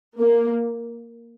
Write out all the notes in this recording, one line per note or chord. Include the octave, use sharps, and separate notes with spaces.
A#3